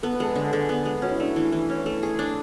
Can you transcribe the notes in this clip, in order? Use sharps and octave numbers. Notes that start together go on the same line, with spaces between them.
B3 A4
B4
G#3 A4
D3
D3 G#4
B3
G#3
C#4 F#4
E4
A3 D4
E3 E4
E3
C#4
A3
G#4
D4